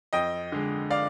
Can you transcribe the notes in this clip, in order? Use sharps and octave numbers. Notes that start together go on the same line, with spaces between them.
F2 D#5 G5
D3 G#3
D5 F5